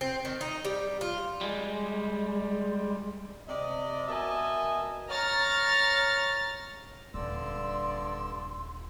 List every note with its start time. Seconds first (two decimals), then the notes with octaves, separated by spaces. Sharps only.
0.01 C4
0.25 D#3
0.41 D#4
0.65 G3
1.01 F4
1.41 G3 G#3
3.48 C3 D5 D#5
4.08 B2 A#4 D#5 E5 G#5 A5
5.08 C#5 A#5 F6 A6
7.14 D#1 G2 D3 D5 C6 E6